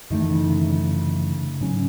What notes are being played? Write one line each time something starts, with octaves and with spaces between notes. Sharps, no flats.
F#2 D#3 E3 A3
C#3
C3
C#3
C#3
G#2 F#3 C#4